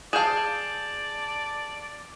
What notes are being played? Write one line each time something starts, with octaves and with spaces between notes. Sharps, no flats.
G#4 D5 F5 A5 G6 E7